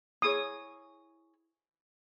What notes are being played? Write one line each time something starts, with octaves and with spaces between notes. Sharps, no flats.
E4 G#4 C#5 D#6